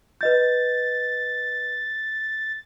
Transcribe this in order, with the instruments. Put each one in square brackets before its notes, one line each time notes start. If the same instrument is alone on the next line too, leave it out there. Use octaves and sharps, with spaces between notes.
[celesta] B4 D#5 G6 [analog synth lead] A6